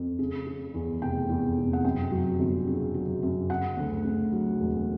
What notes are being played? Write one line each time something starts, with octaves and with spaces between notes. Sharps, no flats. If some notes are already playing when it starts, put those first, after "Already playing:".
Already playing: F2
C#3
C#3
E2
F1 G5
E2
F1
F#5
F#2 G5
F#3
G1
C#3
F#3
F#2
C#3 F#5
D2
C#3
F#3
E1